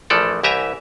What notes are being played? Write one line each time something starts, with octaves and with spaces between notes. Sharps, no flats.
A#1 E3 F3 A3 A4 D5
C2 E3 G4 E5 G#5 A#5